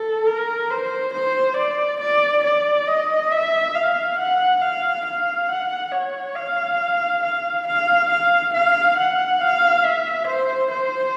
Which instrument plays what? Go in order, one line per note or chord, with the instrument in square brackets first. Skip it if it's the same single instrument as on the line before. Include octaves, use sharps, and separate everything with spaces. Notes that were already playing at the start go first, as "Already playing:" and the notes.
Already playing: [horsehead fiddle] A4
A#4
C5
C5
D5
D5
D5
D#5
E5
F5
F#5
F5
F5
F#5
C#5
F5
F5
F5
F5
F5
F#5
F5
E5
C5
C5